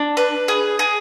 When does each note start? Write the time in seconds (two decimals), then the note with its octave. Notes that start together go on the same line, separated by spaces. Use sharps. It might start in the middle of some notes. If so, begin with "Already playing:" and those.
Already playing: D4
0.17 B4
0.48 G#4
0.79 G#4